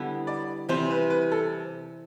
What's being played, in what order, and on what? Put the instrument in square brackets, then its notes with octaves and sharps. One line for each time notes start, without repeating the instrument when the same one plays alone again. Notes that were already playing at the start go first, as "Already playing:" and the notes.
Already playing: [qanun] D3 G3 B3 E4
[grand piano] D5
[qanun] C3 E3 G3 C4 [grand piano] C5
[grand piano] B4
B4
A4